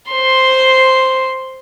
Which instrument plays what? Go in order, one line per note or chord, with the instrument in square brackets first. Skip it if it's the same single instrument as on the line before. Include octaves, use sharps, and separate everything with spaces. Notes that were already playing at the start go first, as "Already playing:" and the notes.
[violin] C5 C6